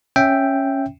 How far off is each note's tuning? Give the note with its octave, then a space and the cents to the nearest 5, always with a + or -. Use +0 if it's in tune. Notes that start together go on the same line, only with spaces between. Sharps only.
C#4 -10 E5 +0 G5 +0